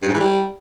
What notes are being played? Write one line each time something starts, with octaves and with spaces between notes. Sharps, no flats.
G2
G#2
E3
G3